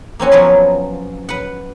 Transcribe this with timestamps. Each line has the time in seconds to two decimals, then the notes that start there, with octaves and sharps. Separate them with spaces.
0.19 A#3 C4 C#4 F#4
0.32 F3 F#3 B3 A#4 B4
1.29 B4 F#5